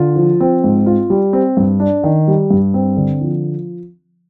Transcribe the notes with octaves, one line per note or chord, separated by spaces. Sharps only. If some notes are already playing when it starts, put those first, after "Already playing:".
Already playing: D3 F4
F3
C4
G#2
F4
G3
C4
G2
D4
D#3
G3
G2
C4
D3
F3